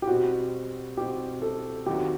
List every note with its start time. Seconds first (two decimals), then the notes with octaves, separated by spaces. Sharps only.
0.02 G4
0.07 B2 G3 C4 F#4
0.97 B2 G3 C4 G4
1.42 A4
1.86 D#2 D#3 F#3 C4 F#4 G4